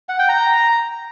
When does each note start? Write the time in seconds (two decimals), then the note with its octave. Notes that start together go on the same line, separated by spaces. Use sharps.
0.09 F#5
0.19 G5
0.29 A#5